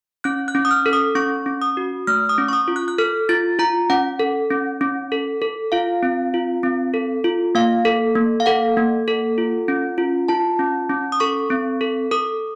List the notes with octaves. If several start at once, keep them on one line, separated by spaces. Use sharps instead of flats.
C#4 F#6
F#6
C#4
D#6
F6
A4
D#6
C#4 C#6
C#4
D#6
F#4
A3 F6
D#6
C#4
C#6
D#6
F4
F#6
F#6
A4 F6
F4 A6
F4 A#5
C#4 F#5
A4
C#4
C#4
A4
A4
F4 F5
C4
F4
C4
A4
F4
A#3 F5
A4
A#3
F5
A4 F#5
A#3
A4
F4
C#4
F4
F4 A5
C#4
C#4
D#6
A4 C#6
C4
A4
A4 D#6